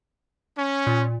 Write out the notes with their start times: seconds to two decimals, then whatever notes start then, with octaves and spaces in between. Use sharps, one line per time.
0.56 C#4
0.87 A#2